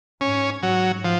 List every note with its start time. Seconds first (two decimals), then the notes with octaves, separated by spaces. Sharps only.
0.21 G#2 C#4
0.62 G#2 F#3
1.05 F3